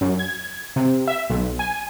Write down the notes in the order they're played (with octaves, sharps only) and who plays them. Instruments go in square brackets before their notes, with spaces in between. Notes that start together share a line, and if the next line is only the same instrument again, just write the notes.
[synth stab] F#2
G#6
C3
E5
B1
G#5